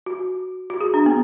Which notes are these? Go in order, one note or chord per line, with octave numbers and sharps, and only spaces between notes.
F#4
F#4
G#4
D4
B3